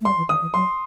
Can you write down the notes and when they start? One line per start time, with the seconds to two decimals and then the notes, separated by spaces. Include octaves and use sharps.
0.01 A3
0.05 G3 C6
0.17 E3
0.29 D#3 D#6
0.41 E3
0.54 F#3 C6